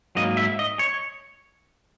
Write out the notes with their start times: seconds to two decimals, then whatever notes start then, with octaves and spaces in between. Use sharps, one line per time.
0.15 G#2 F#3 A#3 D#5
0.37 E5
0.59 D#5
0.79 C#5